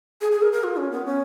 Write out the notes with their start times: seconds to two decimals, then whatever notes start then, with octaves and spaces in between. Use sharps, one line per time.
0.21 G#4
0.32 G#4
0.42 A#4
0.53 A#4
0.63 F4
0.77 C#4
0.91 B3
1.06 C#4